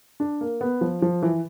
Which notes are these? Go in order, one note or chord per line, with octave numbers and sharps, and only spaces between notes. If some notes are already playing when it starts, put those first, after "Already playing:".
D4
A#3
B3
F3
F3
E3